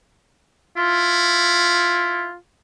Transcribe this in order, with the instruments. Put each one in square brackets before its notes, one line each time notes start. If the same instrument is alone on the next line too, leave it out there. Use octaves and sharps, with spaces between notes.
[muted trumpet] E4 [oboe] F4